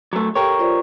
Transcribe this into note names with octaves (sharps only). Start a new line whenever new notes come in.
F#3 A3
G4 A4 A#4 C#5 G5
F4 C5 D5